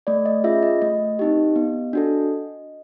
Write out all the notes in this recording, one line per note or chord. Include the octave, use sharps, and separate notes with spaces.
A3 D5
D#5
C#4 F4 G#4 E5
D#5
A3 D#5
C4 D#4 G4
B3
D4 F#4 A4